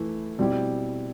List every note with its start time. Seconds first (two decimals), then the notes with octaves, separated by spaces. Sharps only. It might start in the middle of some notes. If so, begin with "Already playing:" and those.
Already playing: E3 A3 E4
0.38 B2 G3 C4 E4 G4